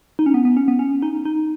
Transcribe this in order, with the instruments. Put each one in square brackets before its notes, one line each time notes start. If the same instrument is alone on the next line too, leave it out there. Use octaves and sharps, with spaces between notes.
[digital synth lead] D#4
C#4
B3
B3
C#4
B3
C#4
D#4
D#4